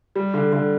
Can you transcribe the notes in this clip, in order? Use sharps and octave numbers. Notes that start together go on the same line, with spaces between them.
G3
D3
D3